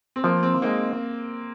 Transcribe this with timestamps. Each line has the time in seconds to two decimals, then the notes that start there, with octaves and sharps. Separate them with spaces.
0.16 C4
0.24 F3 A#3
0.43 C4
0.62 G#3 A#3 C4 D#4